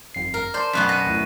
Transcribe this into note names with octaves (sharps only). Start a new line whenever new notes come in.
G1 F2 C7
A#4
C5 D5 A5 C6
F#2 B2 B3 C#6 F#6 B6
B4 A#6 D#7
D2 E4 D#7